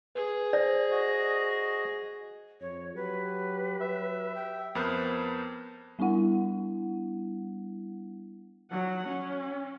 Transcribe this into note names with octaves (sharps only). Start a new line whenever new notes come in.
G#4 B4
C5 D5 A#6
F#4 D#5
F2 C#5
F#3 G4 B4
F#3 E5
G5
F2 B3 A#4 C5 F#6
G3 B3 D4 E4 F#5
F#3 F#5
C#4